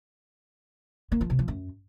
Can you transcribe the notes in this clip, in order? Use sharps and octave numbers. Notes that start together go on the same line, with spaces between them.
A#3
F3
C3
F3
F#2